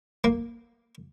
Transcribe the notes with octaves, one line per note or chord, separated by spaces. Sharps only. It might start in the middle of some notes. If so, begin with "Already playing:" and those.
A#3